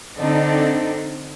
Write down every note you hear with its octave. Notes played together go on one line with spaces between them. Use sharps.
D3 C4 D4 D#4 A4